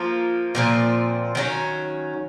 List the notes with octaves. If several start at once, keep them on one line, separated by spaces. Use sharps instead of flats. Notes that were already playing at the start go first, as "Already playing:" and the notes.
Already playing: F3 A#3 F4
A#2 F3 C4
D#3 F#3 C#4